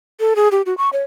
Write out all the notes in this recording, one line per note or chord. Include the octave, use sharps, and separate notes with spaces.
A4
G#4
G4
F#4
C#6
C#5